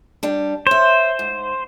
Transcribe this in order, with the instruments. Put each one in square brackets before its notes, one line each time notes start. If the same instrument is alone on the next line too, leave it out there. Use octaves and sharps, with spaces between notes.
[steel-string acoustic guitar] G3 D4
[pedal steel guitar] C5 [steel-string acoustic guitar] C#5 E5
[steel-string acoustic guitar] G#2